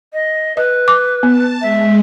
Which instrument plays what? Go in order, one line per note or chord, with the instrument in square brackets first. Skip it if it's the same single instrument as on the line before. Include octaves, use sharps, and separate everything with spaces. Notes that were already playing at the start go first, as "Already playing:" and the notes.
[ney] D#5
[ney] B4 [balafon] D#5
[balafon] D6
[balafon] B3 [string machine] A5
[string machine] G#3 [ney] E5